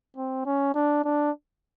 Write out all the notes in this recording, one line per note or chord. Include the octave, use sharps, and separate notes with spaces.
C4
C#4
D4
D4